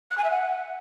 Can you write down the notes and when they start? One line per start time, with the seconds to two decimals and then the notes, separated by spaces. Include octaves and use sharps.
0.11 F#6
0.18 G#5
0.24 E5
0.31 F#5